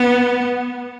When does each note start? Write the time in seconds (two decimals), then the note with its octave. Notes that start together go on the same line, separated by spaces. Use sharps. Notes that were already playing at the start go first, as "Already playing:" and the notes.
Already playing: B3